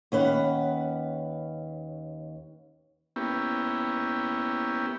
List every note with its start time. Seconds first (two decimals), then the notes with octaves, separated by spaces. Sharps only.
0.12 D#2 C#4 B4 F#5
3.16 A#3 B3 C#4 E4 G4